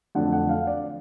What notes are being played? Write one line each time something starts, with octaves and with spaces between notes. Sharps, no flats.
F2 D3 F#3 A3 F#5
F#5
F5
D5